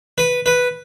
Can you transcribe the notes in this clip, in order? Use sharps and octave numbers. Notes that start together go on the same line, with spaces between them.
B4
B4